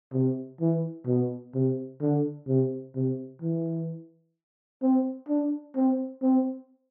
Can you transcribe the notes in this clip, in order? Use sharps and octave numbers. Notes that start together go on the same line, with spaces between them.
C3
E3
B2
C3
D3
C3
C3
E3
C4
D4
C4
C4